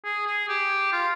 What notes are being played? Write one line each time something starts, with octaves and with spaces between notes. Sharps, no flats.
G#4
G#4
G4
F4